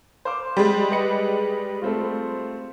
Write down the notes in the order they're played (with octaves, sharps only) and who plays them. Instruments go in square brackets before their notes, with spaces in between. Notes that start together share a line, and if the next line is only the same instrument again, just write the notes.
[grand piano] C5 F5 D6
[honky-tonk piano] G3 G#3
[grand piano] B4 D#5 C#7
A3 C4 F4